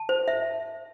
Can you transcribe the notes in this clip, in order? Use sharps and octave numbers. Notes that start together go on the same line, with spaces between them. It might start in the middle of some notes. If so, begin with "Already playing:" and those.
Already playing: A5
C5
E5